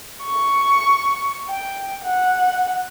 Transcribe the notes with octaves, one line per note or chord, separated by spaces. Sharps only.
C#6
G5
F#5